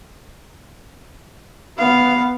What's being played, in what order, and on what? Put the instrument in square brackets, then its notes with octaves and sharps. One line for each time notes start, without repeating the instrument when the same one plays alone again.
[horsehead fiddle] B3 F5